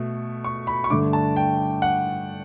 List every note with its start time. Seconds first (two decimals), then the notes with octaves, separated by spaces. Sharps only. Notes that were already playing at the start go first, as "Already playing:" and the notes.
Already playing: B2 A3
0.44 C#6
0.67 B5
0.84 C#6
0.90 G2 D3 A3 D4 D6
1.13 A5
1.36 G5
1.82 F#5